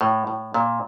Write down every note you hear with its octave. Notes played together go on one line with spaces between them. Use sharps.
A2
A2
A#2